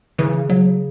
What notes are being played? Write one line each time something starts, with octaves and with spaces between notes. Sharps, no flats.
C#3 E3
F#3